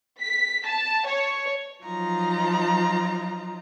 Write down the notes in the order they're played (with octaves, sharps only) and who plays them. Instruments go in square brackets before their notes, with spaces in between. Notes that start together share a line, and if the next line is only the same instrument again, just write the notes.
[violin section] B6
A5
C#5
[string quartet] F3 F#3 D#4 F4 A#5